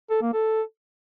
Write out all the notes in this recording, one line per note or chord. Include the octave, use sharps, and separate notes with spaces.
A4
A#3
A4